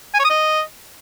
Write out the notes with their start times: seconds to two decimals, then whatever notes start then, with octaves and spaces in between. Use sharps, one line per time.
0.14 G#5
0.19 C#5
0.24 D#6
0.30 D#5